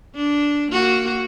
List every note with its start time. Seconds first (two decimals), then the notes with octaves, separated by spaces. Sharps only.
0.15 D4
0.72 A#3 F#4